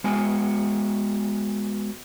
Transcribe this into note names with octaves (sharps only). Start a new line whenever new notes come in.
G#3 B3 F#4 G#5